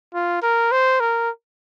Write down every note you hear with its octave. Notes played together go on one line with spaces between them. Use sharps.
F4
A#4
C5
A#4